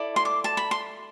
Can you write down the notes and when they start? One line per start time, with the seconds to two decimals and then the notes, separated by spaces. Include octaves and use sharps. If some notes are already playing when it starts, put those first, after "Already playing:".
Already playing: E4 A4 D5
0.16 C6
0.25 D6
0.44 A5
0.57 B5
0.71 C6